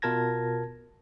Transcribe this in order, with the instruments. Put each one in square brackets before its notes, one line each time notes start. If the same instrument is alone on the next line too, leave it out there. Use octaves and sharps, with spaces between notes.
[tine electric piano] B2 F4 A#4 A5 G#6 A#6